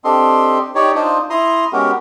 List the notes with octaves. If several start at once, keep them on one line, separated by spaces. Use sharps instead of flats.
C4 D4 G4 A4 D#5 C6
D#4 G4 C#5 D5
D4 D#4 F4 C5 D#5
E4 A#5 C6 D#6
G#3 B3 C#4 F#4 G4 A#4